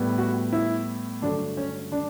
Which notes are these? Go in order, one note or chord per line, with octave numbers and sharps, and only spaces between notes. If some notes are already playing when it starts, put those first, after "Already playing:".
Already playing: A2 G3 B3
F#4
E4
G2 D3 F#3 A3 D4
C#4
D4